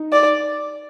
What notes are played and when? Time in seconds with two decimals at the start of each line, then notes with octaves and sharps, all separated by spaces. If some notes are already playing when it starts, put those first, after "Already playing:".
Already playing: D#4
0.12 D5